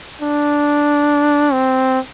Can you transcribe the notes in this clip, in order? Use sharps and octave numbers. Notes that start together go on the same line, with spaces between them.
D4
C4